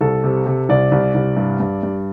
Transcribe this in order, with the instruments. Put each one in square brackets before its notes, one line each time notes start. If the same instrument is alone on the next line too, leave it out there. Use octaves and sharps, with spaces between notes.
[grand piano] C2 A4
C3
C3
C2 D5
C2
C2
G2
G2
G2